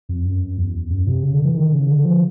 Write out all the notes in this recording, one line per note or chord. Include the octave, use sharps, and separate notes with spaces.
F2
F#2
E2
F#2
C3
C#3
D3
E3
D#3
C#3
D3
F3